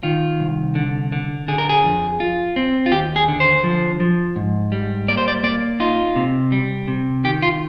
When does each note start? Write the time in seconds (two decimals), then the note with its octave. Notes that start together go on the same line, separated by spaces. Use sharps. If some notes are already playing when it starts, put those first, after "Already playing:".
0.03 D#3 F4
0.40 C2
0.75 D3
1.12 D3
1.48 D3 G#4
1.58 A#4
1.69 G#4
1.84 F2
2.20 F4
2.56 C4
2.86 F4
2.92 D#2 G4
3.16 G#4
3.28 D3
3.40 C5
3.64 F3
4.00 F3
4.36 G#2
4.72 G3
5.08 A#3 D5
5.17 C5
5.28 D5
5.43 A#3 D5
5.80 D#4 F4
6.16 C3
6.52 G3
6.88 C3
7.24 D#3 G4
7.42 F4